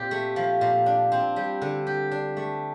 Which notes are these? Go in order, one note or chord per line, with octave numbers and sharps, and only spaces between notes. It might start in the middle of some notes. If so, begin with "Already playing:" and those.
Already playing: A#2 C4 G4
A3
F3
A#2
D4
C4
G3
D3
G4
D4
A3